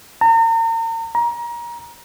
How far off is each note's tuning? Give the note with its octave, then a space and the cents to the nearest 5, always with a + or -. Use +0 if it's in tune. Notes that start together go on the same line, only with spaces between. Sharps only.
A#5 -40
A#5 +25